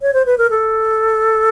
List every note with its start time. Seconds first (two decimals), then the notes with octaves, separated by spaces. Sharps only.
0.02 C#5
0.14 C5
0.26 B4
0.38 A#4
0.50 A4